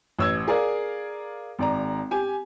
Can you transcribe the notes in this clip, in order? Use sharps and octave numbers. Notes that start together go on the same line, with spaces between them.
A1 E6 G#6
G#4 A#4 D5 F5
G#1 D5 A#5
G4 G#5